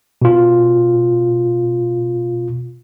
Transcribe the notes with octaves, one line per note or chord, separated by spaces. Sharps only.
B2 F4